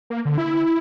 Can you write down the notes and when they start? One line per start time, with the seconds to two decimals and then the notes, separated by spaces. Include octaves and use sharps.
0.10 A#3
0.25 D3
0.38 E4